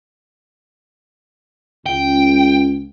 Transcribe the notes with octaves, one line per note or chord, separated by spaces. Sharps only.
C#2 G5